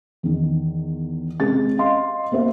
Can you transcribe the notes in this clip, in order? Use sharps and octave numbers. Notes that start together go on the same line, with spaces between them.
E2 D#3
C3 G#3 C#4 A6
D#5 F5 C6
A#3 B3 G4 C5 E5